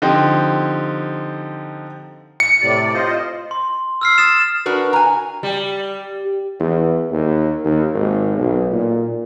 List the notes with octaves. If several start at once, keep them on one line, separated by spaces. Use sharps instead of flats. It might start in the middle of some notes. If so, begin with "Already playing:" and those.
D3 F3 C4 D#4 G4
C#7
A2 C3 D5
F4 C5 D#5
C6
E6 F6 C7
D#6 A6 E7
D4 F#4 A#4 B4
G#5 A#5
G3
E2
D#2
D#2
G#1
B1
A#2